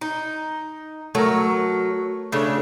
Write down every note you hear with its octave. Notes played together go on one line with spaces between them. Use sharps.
D#4
F#3 A3 A#4
C#3 A3 D4 C#5